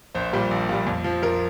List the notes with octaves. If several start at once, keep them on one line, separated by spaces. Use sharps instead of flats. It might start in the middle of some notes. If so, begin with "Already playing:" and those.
A#1 C5
A#2 G3
A#1
A#2 G3
F2
F3
F2 A#4